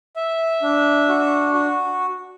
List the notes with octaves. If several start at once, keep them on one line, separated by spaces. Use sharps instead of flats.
E5
D4
F#4
F#4